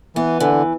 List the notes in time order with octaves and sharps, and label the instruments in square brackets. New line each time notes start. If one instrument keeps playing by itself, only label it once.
[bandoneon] E3 [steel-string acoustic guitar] B3
[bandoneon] D3 [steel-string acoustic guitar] E3